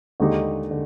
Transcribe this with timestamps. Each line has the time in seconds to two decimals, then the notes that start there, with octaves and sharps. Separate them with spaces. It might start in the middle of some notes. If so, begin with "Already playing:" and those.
0.20 D#2 D3 G#3 D#4 G4
0.71 D3